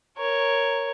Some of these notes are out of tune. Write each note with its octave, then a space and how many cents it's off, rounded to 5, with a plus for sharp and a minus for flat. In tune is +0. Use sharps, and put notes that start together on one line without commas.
A#4 +0 C#5 +0